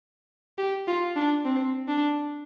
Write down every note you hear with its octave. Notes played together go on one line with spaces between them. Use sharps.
G4
F4
D4
C4
D4